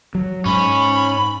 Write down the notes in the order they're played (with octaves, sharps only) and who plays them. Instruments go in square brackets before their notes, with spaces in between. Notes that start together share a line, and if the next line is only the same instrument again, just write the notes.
[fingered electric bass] F#3
[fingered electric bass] G#2 [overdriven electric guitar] C#4 [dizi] B5